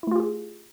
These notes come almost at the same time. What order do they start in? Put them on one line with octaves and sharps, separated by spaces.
E4 A3 F4 G4 G#4